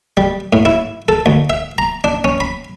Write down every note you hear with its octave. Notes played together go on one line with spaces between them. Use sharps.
G3
A2
E4
A4
D2
E5
A#5
D4
C#4
B5